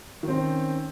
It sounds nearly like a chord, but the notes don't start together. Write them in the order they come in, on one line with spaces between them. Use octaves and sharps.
D#3 C4 C#4